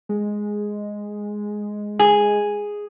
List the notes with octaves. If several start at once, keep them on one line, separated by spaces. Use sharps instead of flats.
G#3
G#4